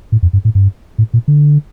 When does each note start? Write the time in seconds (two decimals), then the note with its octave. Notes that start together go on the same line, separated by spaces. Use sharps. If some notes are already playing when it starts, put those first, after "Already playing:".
0.12 A2
0.23 F2
0.33 G2
0.45 A2
0.55 G2
0.98 A2
1.14 A#2
1.28 D3